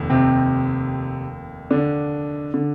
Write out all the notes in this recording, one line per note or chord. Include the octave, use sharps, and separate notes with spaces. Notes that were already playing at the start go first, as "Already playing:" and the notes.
Already playing: F1 D#2
C3 C4
D3 D4
D3